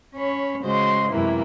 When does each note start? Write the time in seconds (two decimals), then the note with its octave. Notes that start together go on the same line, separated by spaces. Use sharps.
0.14 C#4 C#5 B5
0.62 C#3 G#3 F#4 C5 D#5 C6
1.09 F#2 C3 E3 G#3 A#3 E4